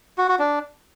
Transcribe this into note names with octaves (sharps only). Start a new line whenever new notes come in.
F#4
F#4
D4